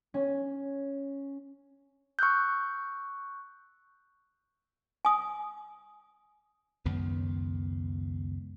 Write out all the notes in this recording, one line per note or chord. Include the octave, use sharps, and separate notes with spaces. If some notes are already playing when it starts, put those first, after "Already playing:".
C#4
C#6 E6 F#6 G6
G#5 D#6
C#2 F#2 D#3 B3